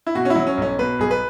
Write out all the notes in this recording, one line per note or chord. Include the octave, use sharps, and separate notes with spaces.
E4
B2 F#4
C#4
E4
F#3
C#4
B1 C#4
B2 B4
B1 G#4
B4